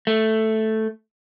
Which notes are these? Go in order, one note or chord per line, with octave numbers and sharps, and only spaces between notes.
A3